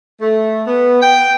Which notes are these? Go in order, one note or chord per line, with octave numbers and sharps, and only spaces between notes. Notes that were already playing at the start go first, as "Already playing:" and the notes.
A3
B3
G5